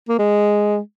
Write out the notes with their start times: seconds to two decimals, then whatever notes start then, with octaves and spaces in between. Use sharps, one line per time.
0.09 A#3
0.19 G#3